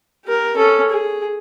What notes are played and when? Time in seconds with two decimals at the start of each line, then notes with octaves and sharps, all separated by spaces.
0.25 G4 A#4
0.57 C#4 A4
0.90 G#4